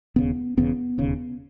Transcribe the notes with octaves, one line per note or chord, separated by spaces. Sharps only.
E1 D#2 C#3 B3
E1 E2 C#3 B3
E1 D#2 C#3